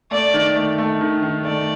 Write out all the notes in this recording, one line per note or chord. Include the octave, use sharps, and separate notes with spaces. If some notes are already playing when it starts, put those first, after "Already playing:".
A3 D5
D#3
A3
A3
D#3
D#3
A3 D5